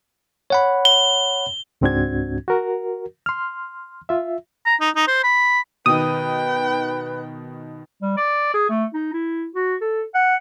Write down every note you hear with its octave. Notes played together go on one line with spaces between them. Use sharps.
C#5 F#5 B5
G7
C#2 G#2 C4 D4 F#4 G#6
F#4 A#4
C6 F6
F4 E5
A#5
D#4
D#4
C5
B5
B2 D#3 B4 G5 D#6
G3
D5
G#4
A3
D#4
E4
F#4
A4
F#5